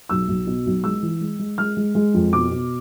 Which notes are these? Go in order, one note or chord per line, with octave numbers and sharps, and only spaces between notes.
B1 E6
B1
B2
B1
G#3 E6
E3
G#3
G#3
G#3 F6
G#3
G#3
F2
B2 D6
B2